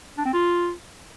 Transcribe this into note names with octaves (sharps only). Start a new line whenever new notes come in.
D4
C4
F4